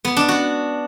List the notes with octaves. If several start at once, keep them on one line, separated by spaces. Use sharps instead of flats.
B3
D4
F#4